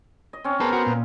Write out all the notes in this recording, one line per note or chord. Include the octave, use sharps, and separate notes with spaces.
D#5
C4 C#4
B3 G#4 A#4 C5 A5
F#4
A#2